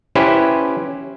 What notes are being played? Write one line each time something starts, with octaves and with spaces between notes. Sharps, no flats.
C#4 E4 G4 B4 C5